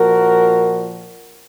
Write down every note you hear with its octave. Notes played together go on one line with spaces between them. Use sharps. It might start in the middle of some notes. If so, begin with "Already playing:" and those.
Already playing: A#2 F3 F#4 A#4